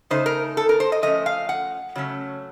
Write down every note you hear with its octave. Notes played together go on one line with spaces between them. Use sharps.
C#3 A3 D#4 C5
A#4
A4
A#4
C5
D#5
F3 A3 C#4 D#5
F5
F#5
C#3 F#3 A3 C#4